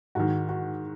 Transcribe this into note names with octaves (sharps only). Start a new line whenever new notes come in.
G#2 D#3 F#4
F#4